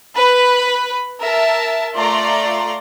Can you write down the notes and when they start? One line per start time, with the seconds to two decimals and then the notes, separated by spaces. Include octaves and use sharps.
0.15 B4 B5
1.21 A#4 E5 A5
1.96 A3 F4 D5 A#5 C6